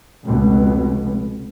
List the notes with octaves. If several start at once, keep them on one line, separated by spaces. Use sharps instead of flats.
F1 C#2 B2